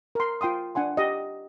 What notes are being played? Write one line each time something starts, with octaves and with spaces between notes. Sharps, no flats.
A#4 C6
F4 G5 C6 D#6
D4 F#5 G#5 C6
G4 D#5